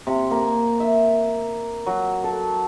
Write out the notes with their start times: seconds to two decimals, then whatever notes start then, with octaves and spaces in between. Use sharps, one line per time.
0.07 C3
0.31 A#3
0.80 E5
1.86 F#3
2.24 A4